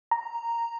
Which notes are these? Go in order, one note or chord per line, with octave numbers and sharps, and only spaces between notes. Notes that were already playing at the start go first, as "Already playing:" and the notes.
A#5